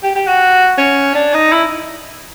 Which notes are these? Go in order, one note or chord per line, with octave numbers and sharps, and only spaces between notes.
G4
G4
F#4
C#4
D4
D#4
E4